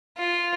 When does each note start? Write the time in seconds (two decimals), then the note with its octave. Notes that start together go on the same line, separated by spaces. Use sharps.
0.18 F4